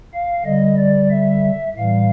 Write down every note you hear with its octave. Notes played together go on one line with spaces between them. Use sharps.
F5
D3 G3 D#5
D5
E5
A2 E3 G3 F5